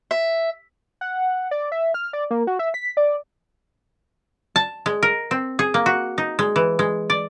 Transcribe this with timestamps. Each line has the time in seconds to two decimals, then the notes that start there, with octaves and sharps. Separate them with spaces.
0.11 E5
1.01 F#5
1.51 D5
1.72 E5
1.94 F6
2.13 D5
2.31 A#3
2.47 F#4
2.59 E5
2.74 B6
2.97 D5
4.56 A5
4.86 G#3
5.03 A#4
5.31 C4
5.59 G#4
5.74 A#3
5.86 F#4
6.18 D#4
6.39 G#3
6.56 E3
6.79 G#3
7.10 D5